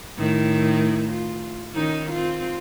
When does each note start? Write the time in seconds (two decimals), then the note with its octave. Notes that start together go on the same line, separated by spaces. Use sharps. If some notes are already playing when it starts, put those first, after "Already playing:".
0.18 A2 D#3 E4
1.10 F4
1.74 D#3 C#4 D#4
2.11 C4 F4